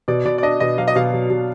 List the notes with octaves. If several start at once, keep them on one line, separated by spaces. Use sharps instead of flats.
B2 D5
B2 D5
D5
D4 D#5
B2 D#5
F#3 F5
D#5
B2 F5
F#3
B2